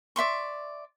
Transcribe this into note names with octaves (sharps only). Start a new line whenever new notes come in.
D5 E5 C6 C#6